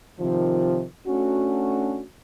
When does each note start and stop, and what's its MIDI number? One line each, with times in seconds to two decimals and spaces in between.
0.19 0.84 48
0.19 0.84 51
0.19 0.84 53
1.07 2.02 57
1.07 2.02 61
1.07 2.02 62
1.07 2.02 66